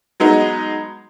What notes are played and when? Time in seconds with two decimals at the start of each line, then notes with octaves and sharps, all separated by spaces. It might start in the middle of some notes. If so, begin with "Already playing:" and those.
0.20 F#3 G#3 B3 D#4